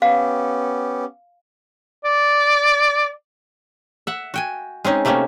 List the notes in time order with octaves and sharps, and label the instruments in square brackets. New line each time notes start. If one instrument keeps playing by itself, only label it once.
[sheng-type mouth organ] B3 C#4 G4 [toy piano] F5
[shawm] D5
[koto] E5 F#5
F#4 G5 G#5
G#3 C4 C#4 D#4
C3 A3 A#3 C4 C#4